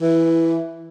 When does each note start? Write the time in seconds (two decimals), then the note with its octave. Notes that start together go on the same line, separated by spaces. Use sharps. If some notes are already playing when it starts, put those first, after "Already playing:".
0.02 E3